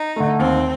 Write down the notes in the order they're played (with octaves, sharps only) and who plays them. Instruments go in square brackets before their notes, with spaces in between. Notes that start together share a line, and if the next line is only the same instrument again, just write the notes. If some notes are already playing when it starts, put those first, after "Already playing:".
Already playing: [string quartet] D#4
[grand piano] D3 A3
[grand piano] D#2 [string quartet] C4